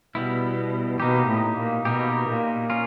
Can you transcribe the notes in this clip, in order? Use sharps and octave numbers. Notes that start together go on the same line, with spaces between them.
B2 G3 B3 E4
B2 A#3 D#4 G4
A2
A#2
B2 A#3 D#4 G4
A#2
A#3 C#4 F4